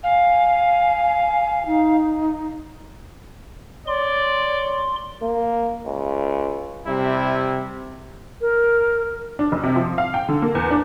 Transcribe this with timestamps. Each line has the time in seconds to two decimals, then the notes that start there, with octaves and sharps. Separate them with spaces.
0.03 F5 G#5
1.67 D#4
3.87 C#5 D5 C6
5.22 A#3
5.86 C#2
6.86 C3 G3 E4
8.41 A#4
9.39 D4
9.52 F#1
9.63 C3
9.76 F3
9.98 F5
10.14 G5
10.29 D3
10.42 A#3
10.55 E2
10.71 D4